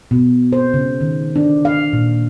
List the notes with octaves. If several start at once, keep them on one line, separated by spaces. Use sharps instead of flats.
B2
C5
C#3
D#3
D4
F5
A#2